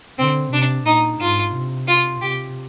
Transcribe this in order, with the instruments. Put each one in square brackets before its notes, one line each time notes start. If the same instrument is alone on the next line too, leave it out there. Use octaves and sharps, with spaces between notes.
[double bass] D3 [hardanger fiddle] C4
[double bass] C3 [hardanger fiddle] D4
[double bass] A#2 [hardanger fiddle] D#4
[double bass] G#2 [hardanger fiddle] F4
[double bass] C3
[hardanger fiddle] F4
[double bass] C3 [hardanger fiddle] G4